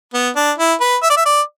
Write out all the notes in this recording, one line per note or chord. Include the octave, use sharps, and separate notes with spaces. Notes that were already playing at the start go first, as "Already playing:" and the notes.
B3
D4
E4
B4
E5
D5
E5
D5